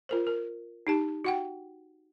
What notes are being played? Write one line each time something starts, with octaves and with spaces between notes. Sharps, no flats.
F4 A#4 C5
A#4
D#4 G4 A5
F#4 F#5 G5